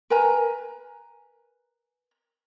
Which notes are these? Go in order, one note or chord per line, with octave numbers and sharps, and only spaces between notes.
A#4 B4 G#5 A#5